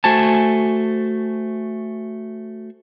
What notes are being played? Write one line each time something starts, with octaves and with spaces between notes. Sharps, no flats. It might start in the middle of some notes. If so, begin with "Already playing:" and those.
A3 F#4 C5 G#5 A5